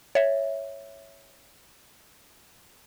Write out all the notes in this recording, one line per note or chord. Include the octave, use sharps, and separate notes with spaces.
C#5 E5